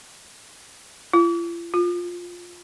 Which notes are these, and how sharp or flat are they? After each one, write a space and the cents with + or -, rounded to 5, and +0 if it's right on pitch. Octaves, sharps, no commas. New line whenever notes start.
F4 -45
F4 +10